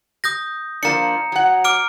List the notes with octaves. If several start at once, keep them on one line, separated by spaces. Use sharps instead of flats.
D#6 G6 A#6
F3 A#3 D4 A#5 C#7
F#3 F#5
D6 F6 D7